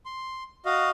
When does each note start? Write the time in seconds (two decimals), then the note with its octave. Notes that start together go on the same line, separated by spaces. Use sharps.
0.06 C6
0.65 F#4 D#5 F5